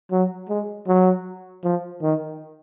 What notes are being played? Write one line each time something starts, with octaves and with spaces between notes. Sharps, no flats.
F#3
G#3
F#3
F3
D#3